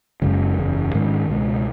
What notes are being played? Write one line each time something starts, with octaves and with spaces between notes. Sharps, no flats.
F#1 F#2 C#3 G#3
F#1 E2 C#3
G#2 D#3 G#3 C#4
C#2 B2 G#3